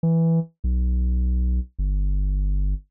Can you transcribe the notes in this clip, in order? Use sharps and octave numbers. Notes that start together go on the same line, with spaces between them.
E3
B1
G1